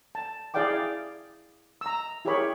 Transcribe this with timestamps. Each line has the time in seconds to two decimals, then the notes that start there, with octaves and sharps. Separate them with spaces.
0.15 A5
0.54 E4 G#4 D5 F5 G5 D6
1.81 A#5 E6
2.25 E4 G4 G#4 A#4 C#5 B5